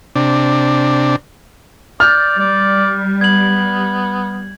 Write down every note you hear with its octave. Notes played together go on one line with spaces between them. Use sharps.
C3 D4
D5 F6 G6 A6
G3 D5
B3 G#6 F#7